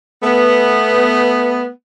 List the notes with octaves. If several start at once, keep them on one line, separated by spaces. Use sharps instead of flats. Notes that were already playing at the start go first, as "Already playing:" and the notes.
A3 B3